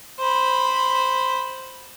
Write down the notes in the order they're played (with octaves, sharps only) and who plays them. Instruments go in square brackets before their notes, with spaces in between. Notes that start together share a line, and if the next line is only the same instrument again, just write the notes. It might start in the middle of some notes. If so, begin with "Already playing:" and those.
[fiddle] C5 B5